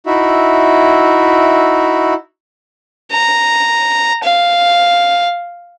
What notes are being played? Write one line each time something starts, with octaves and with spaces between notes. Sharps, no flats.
D#4 E4 F#4 E5
A#5
F5